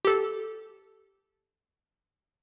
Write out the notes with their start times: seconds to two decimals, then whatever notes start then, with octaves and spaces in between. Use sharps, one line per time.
0.05 G4 A4